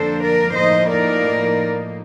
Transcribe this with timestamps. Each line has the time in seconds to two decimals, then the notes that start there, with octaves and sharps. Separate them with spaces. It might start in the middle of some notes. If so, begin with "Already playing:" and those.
Already playing: F2 D3 F3 A#3 D4 A4 C5
0.23 A#4 D5
0.57 A2 F3 A#3 D#4 C5 D#5
0.91 A#4 D5